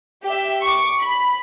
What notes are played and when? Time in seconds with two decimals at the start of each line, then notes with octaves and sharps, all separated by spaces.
0.24 G4 E5
0.64 C#6 D6
1.01 B5